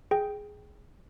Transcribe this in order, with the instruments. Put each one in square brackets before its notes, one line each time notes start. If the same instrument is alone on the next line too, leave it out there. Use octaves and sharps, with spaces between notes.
[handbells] G#4 G5